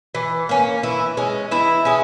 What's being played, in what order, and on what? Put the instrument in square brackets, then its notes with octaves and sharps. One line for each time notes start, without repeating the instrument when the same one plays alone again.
[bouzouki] E3
A#3 C#4
E3 E4
G#3 C#4
E3 E4
G#3 C#4